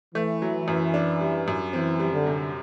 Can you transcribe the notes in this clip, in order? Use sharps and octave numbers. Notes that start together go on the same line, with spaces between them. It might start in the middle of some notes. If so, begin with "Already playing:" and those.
E3 A3
F#3
F#2
D4
G3
F#2
E3 C4
G3
D3
C3